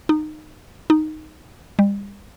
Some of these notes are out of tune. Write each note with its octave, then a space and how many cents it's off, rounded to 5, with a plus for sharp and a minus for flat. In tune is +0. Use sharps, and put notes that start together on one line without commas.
D#4 -20
D#4 -5
G3 +40